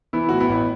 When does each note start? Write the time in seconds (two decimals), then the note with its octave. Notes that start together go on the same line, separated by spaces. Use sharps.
0.13 E3 B3 E4
0.29 A2 F#4
0.40 B3 E4
0.49 A1